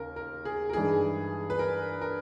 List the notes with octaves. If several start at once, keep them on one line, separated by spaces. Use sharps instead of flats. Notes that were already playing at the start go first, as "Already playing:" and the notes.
Already playing: D#2 C#3 A#4
A#4
G#4
A#4
G2 E3 G#3 D#4 G#4
B4
A#4
A#4